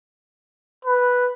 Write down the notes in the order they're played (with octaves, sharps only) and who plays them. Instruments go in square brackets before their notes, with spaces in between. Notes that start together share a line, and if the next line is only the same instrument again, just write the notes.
[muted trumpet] B4